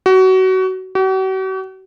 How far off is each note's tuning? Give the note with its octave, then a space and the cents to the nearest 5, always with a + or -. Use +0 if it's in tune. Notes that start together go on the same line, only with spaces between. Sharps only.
F#4 +25
F#4 +45